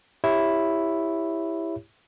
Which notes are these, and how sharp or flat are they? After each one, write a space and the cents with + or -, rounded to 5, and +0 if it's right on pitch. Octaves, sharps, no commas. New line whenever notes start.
E4 +0 G4 +20 C#5 +5